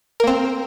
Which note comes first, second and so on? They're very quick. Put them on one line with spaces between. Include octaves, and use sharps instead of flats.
A#4 A#3 C4